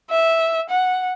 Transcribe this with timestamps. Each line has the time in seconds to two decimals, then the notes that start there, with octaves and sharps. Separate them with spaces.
0.10 E5
0.70 F#5